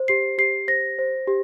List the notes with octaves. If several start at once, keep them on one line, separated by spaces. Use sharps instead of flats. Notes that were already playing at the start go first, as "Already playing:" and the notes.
Already playing: C5
G4 C7
G4 C7
C5 A#6
C5
G4